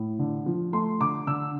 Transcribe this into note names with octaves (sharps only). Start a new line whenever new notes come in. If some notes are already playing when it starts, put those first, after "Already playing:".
Already playing: A2
D3
F3
A3 C6
D3 D6
D3 E6